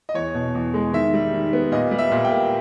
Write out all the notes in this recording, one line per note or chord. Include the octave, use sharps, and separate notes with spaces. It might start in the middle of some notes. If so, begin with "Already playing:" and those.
D#5
E2 C#5
B2
E2
G#3
D#3 E5
G3
D#3
B3
A#2 D#5
G3
E5
A#2
G5
A#3